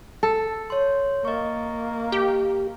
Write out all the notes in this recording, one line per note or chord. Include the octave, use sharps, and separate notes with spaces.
A4
C#5 C6
A#3 D#5 C#6
G4